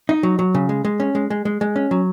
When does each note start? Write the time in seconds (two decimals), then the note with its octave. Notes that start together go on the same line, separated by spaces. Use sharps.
0.09 D#4
0.23 F#3
0.39 F#3
0.55 C#3
0.69 G#3
0.85 G#3
1.00 C#4
1.15 G#3
1.30 G#3
1.45 G#3
1.61 G#3
1.76 C#4
1.91 F#3